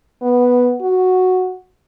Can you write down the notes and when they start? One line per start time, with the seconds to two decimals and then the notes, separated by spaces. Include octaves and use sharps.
0.22 B3
0.81 F#4